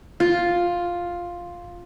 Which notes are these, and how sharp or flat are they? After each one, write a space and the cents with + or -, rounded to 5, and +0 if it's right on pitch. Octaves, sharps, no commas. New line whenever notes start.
F4 +5